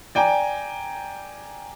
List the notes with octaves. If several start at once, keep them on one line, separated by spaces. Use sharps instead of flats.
D5 G5 G#5 A#5